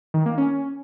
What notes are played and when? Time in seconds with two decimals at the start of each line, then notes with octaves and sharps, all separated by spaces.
0.14 D#3
0.26 A#3
0.38 C#4